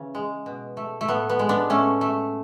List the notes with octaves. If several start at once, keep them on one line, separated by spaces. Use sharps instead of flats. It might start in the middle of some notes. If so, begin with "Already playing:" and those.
Already playing: C#3 E3
G#3
B2
A3
A3
A2 B3
B3
G#3
B3 D4
A2 A3 C#4
A3